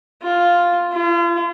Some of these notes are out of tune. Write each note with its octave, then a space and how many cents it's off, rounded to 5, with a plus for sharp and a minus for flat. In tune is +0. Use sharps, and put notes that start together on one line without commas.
F4 +0
F4 -40